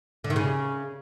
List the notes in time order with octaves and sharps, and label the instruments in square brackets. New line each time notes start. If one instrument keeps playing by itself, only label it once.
[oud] D3
D#3
C#3